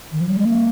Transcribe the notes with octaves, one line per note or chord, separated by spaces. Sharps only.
D#3
F3
G3
G#3
A#3